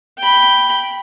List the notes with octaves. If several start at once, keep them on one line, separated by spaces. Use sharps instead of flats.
G5 B5